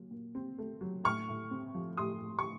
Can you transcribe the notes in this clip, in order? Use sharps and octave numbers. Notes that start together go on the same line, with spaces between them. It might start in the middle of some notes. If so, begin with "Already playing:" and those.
Already playing: A#2 F#3
A#2
C4
A3
F#3
A2 C#6 F6
A2
C4
F3
A2 C6 D#6
A2
C#6